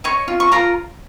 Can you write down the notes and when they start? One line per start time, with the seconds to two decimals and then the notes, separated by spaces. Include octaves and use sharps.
0.04 C#5 D#5 C#6
0.28 F4
0.40 C#6
0.52 F4 A#4 A#5